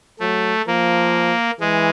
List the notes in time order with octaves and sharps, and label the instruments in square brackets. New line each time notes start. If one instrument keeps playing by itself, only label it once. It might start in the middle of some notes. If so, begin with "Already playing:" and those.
[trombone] F#3 [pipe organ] A3
[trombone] F3 [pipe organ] A#3
[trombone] E3 [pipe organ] G#3